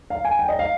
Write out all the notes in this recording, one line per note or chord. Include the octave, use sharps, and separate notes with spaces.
F5
G#5
G5
D#5
F5